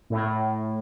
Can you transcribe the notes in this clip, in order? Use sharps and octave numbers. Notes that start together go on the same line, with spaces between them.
A2